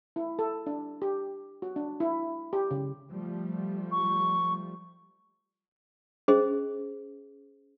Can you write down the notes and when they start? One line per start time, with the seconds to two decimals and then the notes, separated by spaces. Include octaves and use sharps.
0.16 E4
0.39 A4
0.66 D4
1.02 G4
1.62 F#4
1.76 D4
2.00 E4
2.53 G4
2.71 C#3
3.11 F3 G3 A3
3.92 C#6
6.28 C#4 G#4 C5 D#5